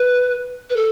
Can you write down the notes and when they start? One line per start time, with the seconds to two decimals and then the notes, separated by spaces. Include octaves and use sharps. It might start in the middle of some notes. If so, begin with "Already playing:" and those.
Already playing: B4
0.70 B4
0.76 A4